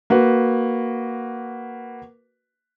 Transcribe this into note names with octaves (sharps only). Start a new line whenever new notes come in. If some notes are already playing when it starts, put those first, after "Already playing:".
A#3 F#4 B4